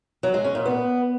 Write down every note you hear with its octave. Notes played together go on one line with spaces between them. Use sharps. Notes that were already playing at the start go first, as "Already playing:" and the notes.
F#3
G#3
C#4
A#2
B3